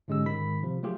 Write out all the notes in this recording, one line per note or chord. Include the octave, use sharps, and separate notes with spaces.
G#2 D3 G#3 C#4 G4 E6
G#2 D#3 B5 B6
C3 F3
F#3 A3 F4 G4 G#4